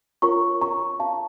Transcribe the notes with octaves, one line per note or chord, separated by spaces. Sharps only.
F4 A#4 C#5 A#5 C#6
A#5 C#6
F5 A5